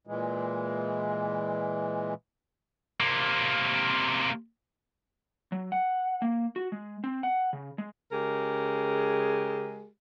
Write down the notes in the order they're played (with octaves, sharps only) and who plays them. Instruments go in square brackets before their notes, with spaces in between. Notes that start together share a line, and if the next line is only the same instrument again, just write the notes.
[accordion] A#2 E3 G#3
[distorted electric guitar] C3 A#3
[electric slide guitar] F#3
F#5
A#3
F#4
G#3
C4
F#5
C#3
G#3
[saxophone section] C#3 G#3 G4 G#4 A#4